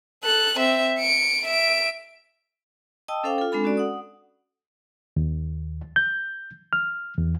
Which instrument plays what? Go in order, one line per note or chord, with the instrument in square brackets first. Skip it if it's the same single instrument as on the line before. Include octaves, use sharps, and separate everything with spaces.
[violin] A4 F#6
C4 E5
C#7 D7
E5 D7
[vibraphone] D#5 G5 A5 D#6 E6
C#4 A4 C5 F5 G5 D6
F4 A4
G#3 C4 D4 A4 B5
C#4 F#4 A4 D5
F#5 D#6
[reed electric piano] D#2
G6
F6
E2